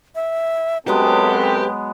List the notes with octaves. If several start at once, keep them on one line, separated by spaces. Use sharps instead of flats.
E5
F#2 F#3 G#3 B3 C4 G4 A4 B4